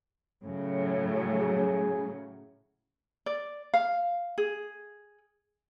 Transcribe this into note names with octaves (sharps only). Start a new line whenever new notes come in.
A2 C#3 F#3
G#4
D5
F5
G#4